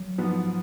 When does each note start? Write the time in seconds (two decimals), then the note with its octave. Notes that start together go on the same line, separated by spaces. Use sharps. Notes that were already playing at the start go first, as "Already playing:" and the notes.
Already playing: F#3
0.18 G#2 F3 B3